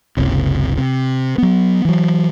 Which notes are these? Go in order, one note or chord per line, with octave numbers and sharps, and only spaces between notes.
F#1 C#2 C3
C3
F#3 B3
E3 F#3